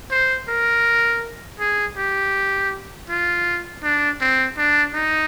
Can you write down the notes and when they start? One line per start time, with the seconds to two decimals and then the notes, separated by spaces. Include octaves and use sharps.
0.11 C5
0.48 A#4
1.60 G#4
1.97 G4
3.09 F4
3.83 D4
4.21 C4
4.57 D4
4.94 D#4